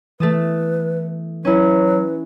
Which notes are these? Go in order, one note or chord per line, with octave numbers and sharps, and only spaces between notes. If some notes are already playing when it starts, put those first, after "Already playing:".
E3 A3 B4 A5 D#6
F#3 C#4 E4 B4